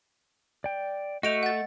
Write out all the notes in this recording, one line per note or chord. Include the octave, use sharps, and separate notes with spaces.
D5 G5
A3 F#4 D#5 G6 D7 F7
F#5 A6